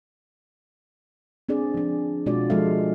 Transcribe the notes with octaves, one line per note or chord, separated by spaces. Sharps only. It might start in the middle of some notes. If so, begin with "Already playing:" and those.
C4 D4 G#4 D5
F3 D4
B2 G#3 D4 F4 F#4 D5
F3 G#3 F4 A4 E5 F5